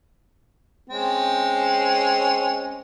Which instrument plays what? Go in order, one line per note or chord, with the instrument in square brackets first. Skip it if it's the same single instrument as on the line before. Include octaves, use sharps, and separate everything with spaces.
[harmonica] G#3 C4 C#4